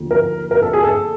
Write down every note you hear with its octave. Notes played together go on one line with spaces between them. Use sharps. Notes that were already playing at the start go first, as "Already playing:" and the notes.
Already playing: D#2 D3 F3
A#4
A#4
A4
G#4
A4